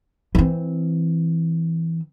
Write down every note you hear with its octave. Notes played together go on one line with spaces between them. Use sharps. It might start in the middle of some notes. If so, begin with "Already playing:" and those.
E3 C4